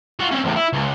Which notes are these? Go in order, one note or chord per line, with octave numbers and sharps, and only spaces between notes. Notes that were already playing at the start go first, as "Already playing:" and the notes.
F4 F#4
C4 C#4
E2 A2
E4
C#2